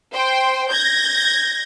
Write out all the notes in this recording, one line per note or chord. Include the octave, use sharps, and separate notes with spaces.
C5 G5 C6
G6 G#6 A#6